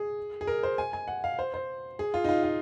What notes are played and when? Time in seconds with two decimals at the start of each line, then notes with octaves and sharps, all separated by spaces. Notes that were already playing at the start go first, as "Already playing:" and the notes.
Already playing: G#4
0.41 G#4
0.47 A#4
0.63 C5
0.78 G#5
0.93 G#5
1.08 F#5
1.24 F5
1.39 C5
1.54 C5
1.99 G#4
2.14 F4
2.24 D#4
2.29 F4
2.44 F4